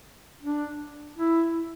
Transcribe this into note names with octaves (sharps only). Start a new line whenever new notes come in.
D4
E4